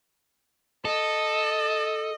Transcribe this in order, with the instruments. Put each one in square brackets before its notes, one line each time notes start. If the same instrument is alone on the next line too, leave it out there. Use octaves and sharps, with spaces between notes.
[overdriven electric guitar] A4 [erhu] D#5